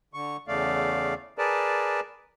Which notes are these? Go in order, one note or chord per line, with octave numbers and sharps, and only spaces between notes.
D3 C#6
E2 C#3 A3 D5 F5
G#4 A#4 B4 D5 A5